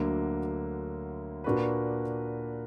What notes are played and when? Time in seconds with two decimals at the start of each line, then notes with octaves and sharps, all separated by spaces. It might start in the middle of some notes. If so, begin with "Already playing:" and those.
Already playing: D2 D3 F#3 A#3
1.44 A#2 A#3 D4 F#4 B4